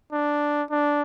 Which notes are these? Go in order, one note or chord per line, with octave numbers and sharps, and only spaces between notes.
D4
D4